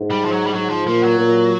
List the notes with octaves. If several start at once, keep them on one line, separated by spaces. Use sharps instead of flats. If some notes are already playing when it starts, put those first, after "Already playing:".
Already playing: G#2
G3
F3
F#3
G3
G#2 F#3
F3
A#2 F3
F#3
A#2